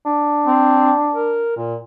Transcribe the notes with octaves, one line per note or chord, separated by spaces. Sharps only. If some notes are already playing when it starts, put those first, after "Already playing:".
D4
C4
A#4
A#2